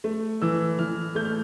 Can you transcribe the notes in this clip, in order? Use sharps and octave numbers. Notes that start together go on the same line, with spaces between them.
A3
E3 E6
E3 F6
A3 G6
F6